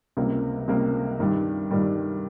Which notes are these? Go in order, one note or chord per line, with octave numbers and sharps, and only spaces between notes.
C#2 C3 G3 A#3
C#2 C3 G3 A#3
G2 D#3 G3
G2 D#3 G3